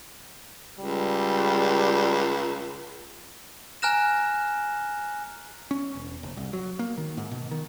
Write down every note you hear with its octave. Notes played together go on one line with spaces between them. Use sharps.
C#2 G3
G#5 A#5 F6 F#6 A#6 E7
C#4
E1
F#1
C2
F#3
A#3
D#3
G#2
B2
D#3